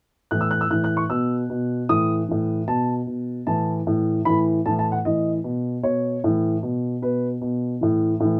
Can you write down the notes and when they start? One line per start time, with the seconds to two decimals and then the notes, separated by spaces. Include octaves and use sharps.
0.31 A2 E3 F#6
0.41 E6
0.51 F#6
0.61 E6
0.71 A2 E3 F#6
0.84 F#6
0.97 C#6
1.10 B2 E6
1.50 B2
1.89 A2 E3 D#6
2.29 A2 E3
2.67 B2 A5
3.07 B2
3.47 A2 E3 A5
3.87 A2 E3
4.25 A2 E3 B5
4.66 A2 E3 A5
4.79 A5
4.92 F#5
5.05 A2 E3 D#5
5.44 B2
5.83 B2 C#5
6.24 A2 E3
6.63 B2
7.02 B2 B4
7.41 B2
7.81 A2 E3
8.20 A2 E3